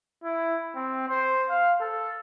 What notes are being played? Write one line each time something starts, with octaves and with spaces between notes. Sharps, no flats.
E4
C4
C5
F5
A4